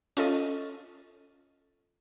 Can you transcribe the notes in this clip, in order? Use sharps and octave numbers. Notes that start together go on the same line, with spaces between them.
C#4 F4 A4 D#5